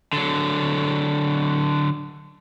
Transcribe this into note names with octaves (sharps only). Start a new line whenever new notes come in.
D3 F#3